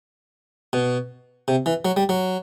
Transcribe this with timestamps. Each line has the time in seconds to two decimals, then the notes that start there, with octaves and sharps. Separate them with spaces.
0.73 B2
1.48 C3
1.66 E3
1.85 F#3
1.97 G3
2.09 F#3